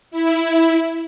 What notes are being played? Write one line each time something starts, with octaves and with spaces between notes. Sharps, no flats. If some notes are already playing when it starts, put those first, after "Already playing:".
E4